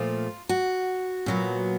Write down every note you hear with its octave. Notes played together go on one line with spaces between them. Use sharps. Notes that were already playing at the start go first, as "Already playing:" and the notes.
Already playing: A#2 F3 A3 F4
F#4
A#2 F#3 B3